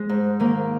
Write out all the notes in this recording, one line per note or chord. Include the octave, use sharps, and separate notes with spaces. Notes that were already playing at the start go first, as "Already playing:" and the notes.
Already playing: G#3
G#2
D#3 A#3